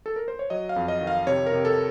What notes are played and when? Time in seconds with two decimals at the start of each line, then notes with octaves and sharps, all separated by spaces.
0.06 A4
0.16 A#4
0.28 C5
0.39 C#5
0.50 F#3 D#5
0.69 F5
0.76 F2
0.88 D#5
1.01 D#3
1.07 F5
1.27 C3 C#5
1.46 A#4
1.52 C3
1.65 A4